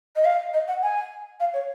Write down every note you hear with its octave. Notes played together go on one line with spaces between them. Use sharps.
D#5
F5
D#5
F#5
G#5
F5
C#5